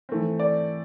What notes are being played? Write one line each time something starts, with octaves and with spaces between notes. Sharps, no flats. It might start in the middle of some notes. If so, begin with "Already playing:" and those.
E3 A3 C4
D5